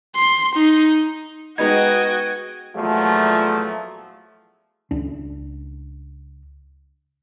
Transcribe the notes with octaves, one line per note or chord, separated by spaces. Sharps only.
C6
D#4
G#3 B3 D#4 F#4 D#5 G5 G#6
E2 A#2 F3 F#3 A3
C#2 D4